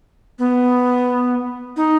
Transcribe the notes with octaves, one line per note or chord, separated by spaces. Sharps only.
B3
D#4